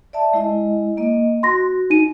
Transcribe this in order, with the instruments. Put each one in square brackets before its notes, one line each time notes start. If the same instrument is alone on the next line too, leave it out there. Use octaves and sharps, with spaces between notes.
[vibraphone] D5 E5 A5
G#3 E4 D#5
A#3 D#5
[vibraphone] F#4 [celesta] C6 A#6
[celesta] D#4 D#7